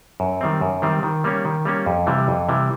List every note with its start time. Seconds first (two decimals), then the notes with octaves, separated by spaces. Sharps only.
0.20 F#2
0.41 D#3 G3 C4
0.61 F#2
0.82 D#3 G3 C4
1.03 D#3
1.24 G3 A#3 C#4
1.45 D#3
1.65 G3 A#3 C#4
1.86 F2
2.07 C3 E3 G3
2.28 F2
2.49 C3 E3 G3